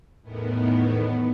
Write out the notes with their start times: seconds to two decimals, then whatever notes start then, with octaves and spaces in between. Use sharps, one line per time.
0.23 E2 A2 D#3 B3